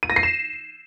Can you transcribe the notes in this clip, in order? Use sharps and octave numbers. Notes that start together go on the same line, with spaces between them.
D#7
A#6
C7
E7